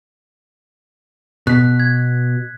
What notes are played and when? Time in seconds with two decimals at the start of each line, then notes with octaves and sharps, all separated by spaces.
1.47 B2 F#6 B6
1.80 G#6